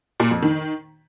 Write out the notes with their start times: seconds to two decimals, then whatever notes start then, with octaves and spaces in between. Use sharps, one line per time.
0.20 A#2
0.31 F2
0.42 D#3